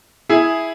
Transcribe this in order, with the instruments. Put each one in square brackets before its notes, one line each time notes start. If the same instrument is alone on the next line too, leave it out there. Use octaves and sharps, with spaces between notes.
[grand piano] E4 G#4